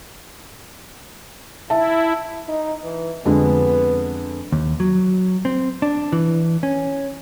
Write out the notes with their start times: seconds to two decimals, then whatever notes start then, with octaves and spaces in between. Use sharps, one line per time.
1.70 E4 E5 A5
2.48 D#4
2.84 E3
3.25 F2 D3 G#3 B3
4.52 D#2
4.80 F#3
5.45 C4
5.82 D4
6.12 E3
6.63 C#4